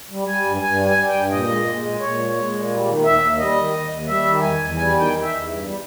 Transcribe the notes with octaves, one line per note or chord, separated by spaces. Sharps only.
G3
G3 G#5
G2
G2 G#5
G3
G#5
G3
G5
G2
A#2 D#5
G#3
G#3
A#2
A#2 C#5
G#3
G#3
A#2
G3
D#3
D#2 E5
D#2
G3 D#5
D#3
D#2
D#2
G3 E5
D#3
E2 G#5
E2
G3 G#5
D#3
G5
E2
E5
E2
G2
G3